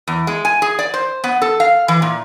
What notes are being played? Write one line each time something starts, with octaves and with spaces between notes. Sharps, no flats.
E2
G#3
G#5
G#4
D5
C5
B3
A4
F5
E3
A#2